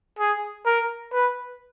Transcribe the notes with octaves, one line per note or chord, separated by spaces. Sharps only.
G#4
A#4
B4